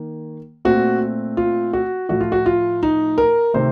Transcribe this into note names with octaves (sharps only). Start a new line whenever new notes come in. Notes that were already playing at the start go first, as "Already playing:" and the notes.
Already playing: D#3 A#3
A#2 A3 C4 F#4
F4
F#4
A2 F3 A3 F#4
F4
F#4
F4
D#4
A#4
C3 D#3 A3 C5